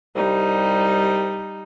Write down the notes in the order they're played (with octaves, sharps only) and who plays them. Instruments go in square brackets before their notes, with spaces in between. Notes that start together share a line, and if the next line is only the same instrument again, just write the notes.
[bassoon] C2 [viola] G3 D#4